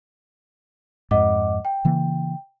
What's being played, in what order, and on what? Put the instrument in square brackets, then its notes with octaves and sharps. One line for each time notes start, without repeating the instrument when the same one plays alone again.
[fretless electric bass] F2 G#2 [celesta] D#5 F#5 D6
[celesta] G5
[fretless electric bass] C#3 E3 A#3